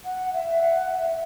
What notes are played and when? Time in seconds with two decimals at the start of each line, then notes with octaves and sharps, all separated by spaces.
0.05 F#5
0.33 E5
0.61 F#5
0.90 E5